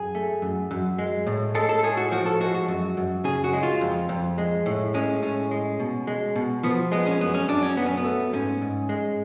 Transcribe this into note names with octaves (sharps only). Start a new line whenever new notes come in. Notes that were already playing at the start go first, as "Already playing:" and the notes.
Already playing: F#2 G#4
A3
F#2
F#2
G#3
A2
G#3 A4
A4
A2 G#4
F#4
F3 F#4
A4
G#3 F#4
F#4
F#2
F#2
C#3 G#4
F#4
G#3
F4
F2
F2
G#3
A2
G#3 C#4
A2 C#4
G#3
B2
G#3
B2
F3 B3
G#3 B3
C#4
F#2 B3
C#4
F#2 D4
C#4
F#3 B3
C#4
B3
A3
G#2 C#4
G#2
G#3